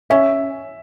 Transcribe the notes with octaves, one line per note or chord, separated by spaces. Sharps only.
C#4 E5